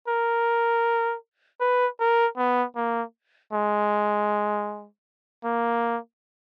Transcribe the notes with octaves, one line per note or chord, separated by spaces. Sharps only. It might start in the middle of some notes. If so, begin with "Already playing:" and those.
A#4
B4
A#4
B3
A#3
G#3
A#3